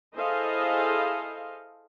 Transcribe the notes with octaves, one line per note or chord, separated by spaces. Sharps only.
E4 G#4 A4 C5 D#5 F5